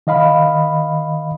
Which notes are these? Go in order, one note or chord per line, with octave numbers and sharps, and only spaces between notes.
D#3 D#5 F5 B5